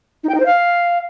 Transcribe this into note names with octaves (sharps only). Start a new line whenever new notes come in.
D#4
G5
D#4
C5
F5